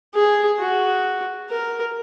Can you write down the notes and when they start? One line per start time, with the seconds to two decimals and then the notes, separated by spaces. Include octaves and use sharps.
0.15 G#4
0.59 F#4
1.50 A#4